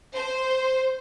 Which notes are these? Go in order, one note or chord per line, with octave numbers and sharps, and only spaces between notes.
C5